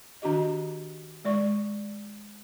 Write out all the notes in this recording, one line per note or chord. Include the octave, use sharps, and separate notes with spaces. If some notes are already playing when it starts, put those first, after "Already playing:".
D#3 D4 F#4 G4 D#5
G#3 D5 C#6